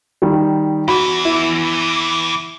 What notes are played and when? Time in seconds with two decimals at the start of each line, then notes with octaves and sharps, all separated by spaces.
0.22 D#3 G3
0.88 E2 E3 F#4 B5
1.25 E4